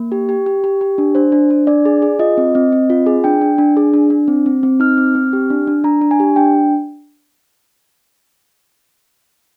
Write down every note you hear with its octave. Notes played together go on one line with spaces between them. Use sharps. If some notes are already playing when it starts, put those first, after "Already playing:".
Already playing: A#3
G4
G4
G4
G4
G4
D4
D4 C5
D4
D4
D4 D5
G#4
G#4
F4 D#5
C4
C4
C4
F4
G#4
D4 G5
D4
D4
G#4
D4
D4
C4
C4
C4
D#4 F6
C4
C4
G4
D4
D4
D4 A#5
D4
G#5
G4
D4 G5